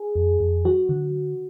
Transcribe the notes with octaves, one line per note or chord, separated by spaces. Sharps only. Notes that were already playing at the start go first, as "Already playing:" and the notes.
Already playing: G#4
F2
F2
F#3 F#4
D3